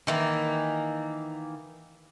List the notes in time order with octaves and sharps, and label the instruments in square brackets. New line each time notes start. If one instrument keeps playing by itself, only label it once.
[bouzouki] D#3 E3 A#3